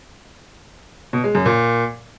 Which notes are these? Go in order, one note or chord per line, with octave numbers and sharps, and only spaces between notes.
B2
G#3
F#2
A#2